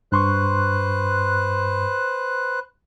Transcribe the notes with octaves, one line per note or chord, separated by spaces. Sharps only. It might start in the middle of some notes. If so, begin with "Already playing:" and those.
G2 B4 C5 C6 C#6 F#6